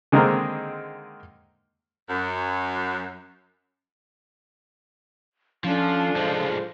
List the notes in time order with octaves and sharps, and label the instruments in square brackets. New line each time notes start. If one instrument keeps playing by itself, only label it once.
[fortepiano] D3 D#3 G#3 A#3 C4 D#4
[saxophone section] F#2
[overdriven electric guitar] F3 [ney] C#4 [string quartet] D4 F4 A4
[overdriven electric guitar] F3 G#3 [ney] C5